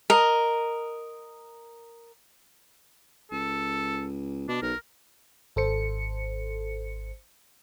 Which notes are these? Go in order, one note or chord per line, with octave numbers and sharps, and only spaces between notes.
A#4 D#5
C#2 A4
B2 D4
B1 A#4
G#1 A4 C5 C#7